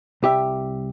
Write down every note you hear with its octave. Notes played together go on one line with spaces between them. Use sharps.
C2 G4 E5